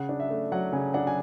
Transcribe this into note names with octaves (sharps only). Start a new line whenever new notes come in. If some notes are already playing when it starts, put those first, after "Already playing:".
Already playing: C#3 F#5
D4
E5
A3
F#3 F#5
C#3 G#5
D4 F#5
G#5